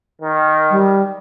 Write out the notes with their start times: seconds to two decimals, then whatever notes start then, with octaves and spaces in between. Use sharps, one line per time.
0.22 D#3
0.71 G3